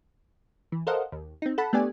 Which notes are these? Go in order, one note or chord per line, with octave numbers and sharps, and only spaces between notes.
E3
A4 A#4 C5 D#5 F5 F#5
D#2
C4 D#4
A4 F#5 A5 B5
A3 B3 D4 G4 D5 G#5